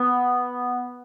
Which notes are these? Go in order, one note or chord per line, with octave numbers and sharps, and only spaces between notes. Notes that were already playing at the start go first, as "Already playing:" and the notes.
Already playing: B3